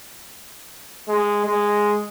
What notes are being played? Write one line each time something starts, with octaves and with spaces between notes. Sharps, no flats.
G#3
G#3